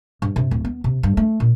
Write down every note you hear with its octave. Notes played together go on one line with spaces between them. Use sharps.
G2
C3
D1
B3
C3
G2
A3
A#2